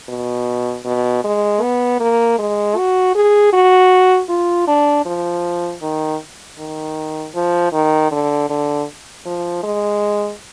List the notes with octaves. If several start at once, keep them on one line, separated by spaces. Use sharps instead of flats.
B2
B2
G#3
B3
A#3
G#3
F#4
G#4
F#4
F4
D4
F3
D#3
D#3
F3
D#3
D3
D3
F3
G#3